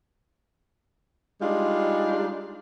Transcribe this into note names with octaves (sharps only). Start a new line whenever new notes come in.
G3 G#3 D4 D#4 F4